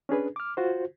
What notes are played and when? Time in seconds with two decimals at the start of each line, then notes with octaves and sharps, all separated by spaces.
0.09 C#4 D4 G#4 B4
0.36 D6 F6
0.57 F4 F#4 C5